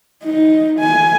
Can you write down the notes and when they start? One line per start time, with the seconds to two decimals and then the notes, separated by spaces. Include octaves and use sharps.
0.24 D#4
0.80 G#5